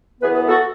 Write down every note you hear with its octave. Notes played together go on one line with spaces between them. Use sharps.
F#2 E3 B3 G#4 B4
G#4 B4
F#4 A4